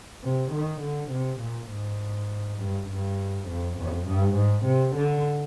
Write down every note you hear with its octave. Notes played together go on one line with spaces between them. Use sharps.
C3
D#3
D3
C3
A#2
G#2
G2
G2
F2
F2
G2
G#2
C3
D3